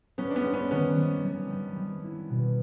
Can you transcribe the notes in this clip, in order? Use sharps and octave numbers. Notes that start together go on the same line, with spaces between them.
G3 B3 C#4
D4
B3 C#4
C4
B3 C#4
D#3 B3 C#4
G3
G3
G3
G3
E4
B2